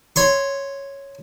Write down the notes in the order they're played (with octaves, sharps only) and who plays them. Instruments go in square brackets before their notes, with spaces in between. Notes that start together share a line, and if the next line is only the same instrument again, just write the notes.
[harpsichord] C#5 C6 C#6